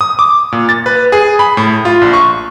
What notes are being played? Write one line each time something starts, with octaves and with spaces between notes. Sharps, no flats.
D#6
D6
A#2
A6
B4
G#4
B5
A2
F4
A#1
C#6